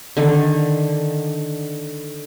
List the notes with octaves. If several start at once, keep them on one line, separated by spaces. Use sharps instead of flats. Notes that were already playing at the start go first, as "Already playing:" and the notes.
D3 D#3